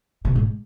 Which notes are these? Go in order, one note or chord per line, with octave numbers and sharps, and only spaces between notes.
B2
G#2